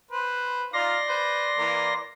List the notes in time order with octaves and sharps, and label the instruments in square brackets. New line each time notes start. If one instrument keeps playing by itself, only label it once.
[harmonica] B4 C5
[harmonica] D#4 F4 F5 [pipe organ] D5 C6 A#6
[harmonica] B4 C5
E3 A#3